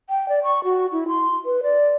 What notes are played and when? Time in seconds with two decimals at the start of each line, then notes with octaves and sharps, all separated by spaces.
0.10 G5
0.29 D5
0.44 C#6
0.64 F#4
0.92 E4
1.08 C6
1.46 B4
1.63 D5